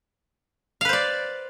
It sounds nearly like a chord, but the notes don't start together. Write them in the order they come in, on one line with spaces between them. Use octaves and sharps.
F5 B4 C5 D5